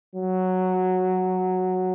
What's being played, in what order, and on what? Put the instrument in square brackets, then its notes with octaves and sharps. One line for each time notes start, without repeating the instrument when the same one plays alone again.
[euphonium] F#3